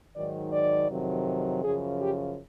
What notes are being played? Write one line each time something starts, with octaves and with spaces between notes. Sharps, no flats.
G#2 D#3 F#3 D5
D5
F2 C3 D#3 F#3
F#2 C#3 F3 G#4
G4